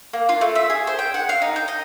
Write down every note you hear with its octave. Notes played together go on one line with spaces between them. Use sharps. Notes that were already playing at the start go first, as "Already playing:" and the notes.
A#3
F4
A3
E5
G#4
C5
G5
F#5
F5
D#4
G5
D#5